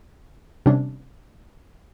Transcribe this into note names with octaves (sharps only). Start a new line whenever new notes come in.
C3 D#3 G3 C#4 D4